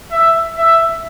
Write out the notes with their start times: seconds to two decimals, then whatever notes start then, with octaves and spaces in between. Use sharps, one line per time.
0.11 E5
0.57 E5